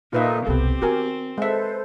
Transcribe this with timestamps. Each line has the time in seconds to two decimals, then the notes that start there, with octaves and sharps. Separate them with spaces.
0.13 A#2 D#4 F4 A4 B4 E5
0.47 E1 C2 B3 C4 G4 A4
0.82 D#3 F#4 A#4 G#5
1.38 G#3 A4 B4 C5 E5